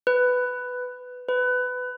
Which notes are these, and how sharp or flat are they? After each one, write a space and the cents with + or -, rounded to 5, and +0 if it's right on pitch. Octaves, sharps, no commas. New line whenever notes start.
B4 +10
B4 +20